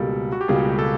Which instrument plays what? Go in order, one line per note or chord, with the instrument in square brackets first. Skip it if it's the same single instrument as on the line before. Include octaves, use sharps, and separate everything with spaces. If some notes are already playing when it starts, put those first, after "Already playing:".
Already playing: [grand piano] C#2 B2 G3 A#3 [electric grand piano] A4
[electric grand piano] F#4
G4
[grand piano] C#2 B2 G3 A#3 [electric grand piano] G#4
[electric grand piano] A4